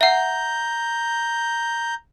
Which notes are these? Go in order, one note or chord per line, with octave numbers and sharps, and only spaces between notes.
E5 F#5 A#5 G6